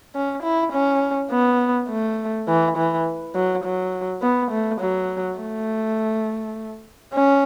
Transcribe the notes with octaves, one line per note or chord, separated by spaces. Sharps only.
C#4
E4
C#4
B3
A3
E3
E3
F#3
F#3
B3
A3
F#3
A3
C#4